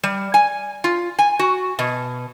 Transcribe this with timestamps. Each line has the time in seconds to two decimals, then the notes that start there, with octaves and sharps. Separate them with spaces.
0.03 G3
0.34 G#5
0.84 F4
1.19 G#5
1.39 F#4
1.79 B2